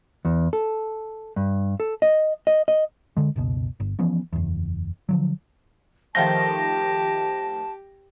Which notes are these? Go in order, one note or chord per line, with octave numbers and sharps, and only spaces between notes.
E2
A4
G2
A4
D#5
D#5
D#5
D3 G#3
F#1 C#2 B2
G1
E3 F3 B3 C#4
F#1 E2
D3 F3 F#3
D#3 F3 A3 G4 A5 A#6